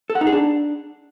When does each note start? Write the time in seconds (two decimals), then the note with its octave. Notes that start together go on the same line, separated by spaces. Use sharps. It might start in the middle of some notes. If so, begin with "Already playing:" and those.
0.10 A4
0.15 F#5
0.21 D#4
0.27 G#4
0.33 D4